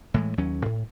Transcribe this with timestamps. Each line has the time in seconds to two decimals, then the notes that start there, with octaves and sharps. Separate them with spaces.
0.14 A2 E3 G#3
0.38 D#2 F#3 C#4
0.66 A2